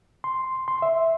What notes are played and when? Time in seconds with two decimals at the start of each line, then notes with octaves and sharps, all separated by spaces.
0.24 C6
0.68 C6
0.82 E5